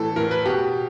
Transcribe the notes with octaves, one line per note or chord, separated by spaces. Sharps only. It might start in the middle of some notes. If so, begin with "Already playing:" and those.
Already playing: A2 E3 A4
A2 E3 A#4
B4
B2 G4